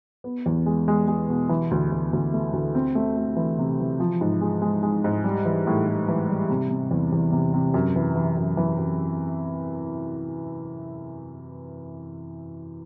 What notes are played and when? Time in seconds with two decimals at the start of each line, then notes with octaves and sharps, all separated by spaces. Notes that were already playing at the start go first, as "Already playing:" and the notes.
0.24 B3
0.46 E2
0.66 G#3
0.88 G#3
1.07 G#3
1.28 B2
1.49 E3
1.71 D2
1.92 D2
2.13 D2
2.33 A3
2.53 D2
2.75 C4
2.95 A3
3.17 A3
3.37 E3
3.58 C3
3.79 E3
4.00 F3
4.21 G#2
4.41 G#3
4.62 G#3
4.83 G#3
5.04 G#2
5.24 G3
5.45 E3
5.67 A2
5.87 A2
6.08 E3
6.29 G3
6.50 C3
6.70 C3
6.91 E2
7.12 E2
7.32 C3
7.54 C3
7.74 F#2
7.96 E3
8.16 E3
8.37 F#2
8.57 E3
8.78 F#2